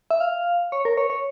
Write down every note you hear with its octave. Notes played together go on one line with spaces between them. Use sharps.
E5
F5
C#5
A#4
C#5
C#5